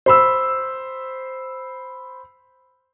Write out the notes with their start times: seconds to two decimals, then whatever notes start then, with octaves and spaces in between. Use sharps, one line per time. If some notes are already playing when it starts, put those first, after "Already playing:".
0.06 C5 B5 E6